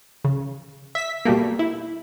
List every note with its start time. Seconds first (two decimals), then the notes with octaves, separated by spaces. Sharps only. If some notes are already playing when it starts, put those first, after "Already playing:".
0.24 C#3
0.95 E5 B6
1.25 B2 G3 A3 A#3
1.59 E4